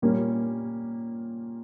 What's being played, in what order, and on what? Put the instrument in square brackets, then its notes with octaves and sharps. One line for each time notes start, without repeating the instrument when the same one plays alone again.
[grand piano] A#2 G3 A#3 C#4